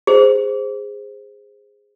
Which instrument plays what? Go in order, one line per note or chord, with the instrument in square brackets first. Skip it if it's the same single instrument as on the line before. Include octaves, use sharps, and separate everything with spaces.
[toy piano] G#4 C5